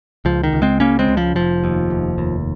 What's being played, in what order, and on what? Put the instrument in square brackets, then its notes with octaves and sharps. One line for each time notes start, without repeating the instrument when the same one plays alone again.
[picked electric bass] C#2 F3
D#3
C#2
G#3 C4
C#3 A#3 C#4
G#3 C4
C#2
F3
F1 F3
D#2
F1
D#2